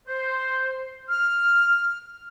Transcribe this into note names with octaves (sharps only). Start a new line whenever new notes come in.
C5
F6